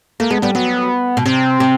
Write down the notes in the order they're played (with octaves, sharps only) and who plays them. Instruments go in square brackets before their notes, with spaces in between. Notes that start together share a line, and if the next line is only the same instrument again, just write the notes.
[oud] A3 [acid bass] A#3
[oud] G#3 [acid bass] B3
[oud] G3 [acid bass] B3
[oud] F#3 [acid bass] B3
[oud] B2
[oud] C3 [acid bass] C4
[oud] C3